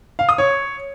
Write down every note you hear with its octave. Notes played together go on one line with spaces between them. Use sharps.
F5
D#6
C#5